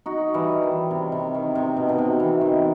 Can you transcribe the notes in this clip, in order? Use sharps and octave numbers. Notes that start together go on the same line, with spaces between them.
D#4 F#4
E3 G3
D#3
C3
C3
D#3
C3
B2
B2
C3
E3
D#3